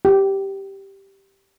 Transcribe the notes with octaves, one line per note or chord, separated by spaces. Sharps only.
G4